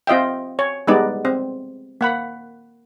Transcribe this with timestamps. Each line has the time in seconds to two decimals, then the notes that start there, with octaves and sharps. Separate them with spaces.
0.07 C4 F4 D#5 E5 G5
0.59 C#5
0.87 G3 G#3 B3 D#4 D5
1.25 C4
2.01 A#3 F#5 B5